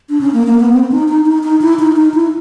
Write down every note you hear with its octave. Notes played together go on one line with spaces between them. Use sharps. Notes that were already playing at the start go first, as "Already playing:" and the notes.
D4
C#4
A#3
A#3
B3
C4
D#4
D#4
D#4
D#4
E4
D#4
D#4
E4